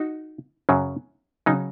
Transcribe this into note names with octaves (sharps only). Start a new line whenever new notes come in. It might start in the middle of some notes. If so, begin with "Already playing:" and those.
Already playing: D#4 F#4
F#2 C#3 F#3
C#3 F#3 D#4